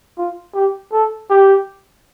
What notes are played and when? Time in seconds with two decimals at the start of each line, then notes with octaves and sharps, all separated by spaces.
0.17 F4
0.55 G4
0.92 A4
1.30 G4